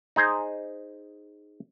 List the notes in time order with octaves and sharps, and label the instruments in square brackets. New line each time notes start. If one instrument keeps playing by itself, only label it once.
[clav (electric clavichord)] D#4 G#4 C5